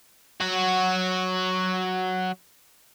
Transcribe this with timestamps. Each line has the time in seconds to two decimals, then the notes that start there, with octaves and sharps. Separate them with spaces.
0.40 F#3 F#4